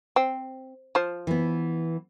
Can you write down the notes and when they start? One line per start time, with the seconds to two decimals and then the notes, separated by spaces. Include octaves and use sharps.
0.16 C4
0.95 F3 C5
1.27 E3 B3